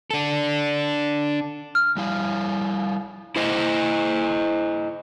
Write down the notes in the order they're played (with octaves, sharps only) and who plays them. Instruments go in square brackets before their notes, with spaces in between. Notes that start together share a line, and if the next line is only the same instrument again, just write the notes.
[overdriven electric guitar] D4 A4
[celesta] F6
[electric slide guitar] G3 E4 F5
E4 C5 D#5